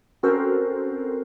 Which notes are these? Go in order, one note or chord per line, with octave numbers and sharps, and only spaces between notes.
C4 C#4 F#4 A4 A#4 C5